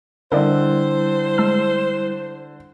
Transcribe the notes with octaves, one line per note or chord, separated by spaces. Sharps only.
D3 G3 E4 A#4 C5 D5 D#5
G#3 A5 E6